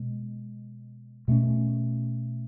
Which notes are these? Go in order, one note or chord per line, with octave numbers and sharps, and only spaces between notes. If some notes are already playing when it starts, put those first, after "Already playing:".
Already playing: B2 G#3
B2 A3 C#4